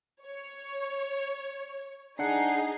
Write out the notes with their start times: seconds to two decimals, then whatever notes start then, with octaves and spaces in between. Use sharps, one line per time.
0.24 C#5
2.19 D4 D#4 G#4 F#5 C7